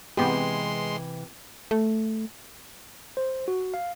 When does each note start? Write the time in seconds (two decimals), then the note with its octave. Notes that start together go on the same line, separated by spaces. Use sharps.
0.17 C3 E3 G#3 B3 G4 B4 C6
1.71 A3
3.17 C5
3.48 F#4
3.74 F5